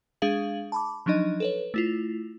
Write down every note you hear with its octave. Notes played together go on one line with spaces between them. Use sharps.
G#3 D4 G#4 F5 F#7
A5 B5 D6
F3 F#3 D4 D#4 D#5
A4 B4 C#5
A3 E4 F4